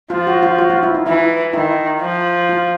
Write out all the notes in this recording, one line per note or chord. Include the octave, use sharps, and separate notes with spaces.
F3 F4
F#4
F4
F#4
F4
E4
D#4
E3 E4
D#3 E4
F3
F4